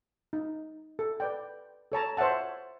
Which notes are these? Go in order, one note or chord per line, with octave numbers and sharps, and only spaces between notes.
D#4
A4
B4 D5 G5
A4 C#5 A5 A#5
C5 C#5 E5 F#5 A5